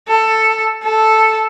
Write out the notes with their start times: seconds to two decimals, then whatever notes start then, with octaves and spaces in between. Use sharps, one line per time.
0.08 A4
0.83 A4